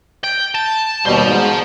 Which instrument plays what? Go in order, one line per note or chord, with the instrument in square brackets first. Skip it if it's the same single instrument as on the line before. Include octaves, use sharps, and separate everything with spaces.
[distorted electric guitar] G5
A5
[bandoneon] D#2 B2 G3 [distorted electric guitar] C5 A5
[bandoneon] G#2